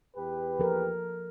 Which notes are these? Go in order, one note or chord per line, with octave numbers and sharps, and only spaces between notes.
E2 G4 B4
F3 A4 A#4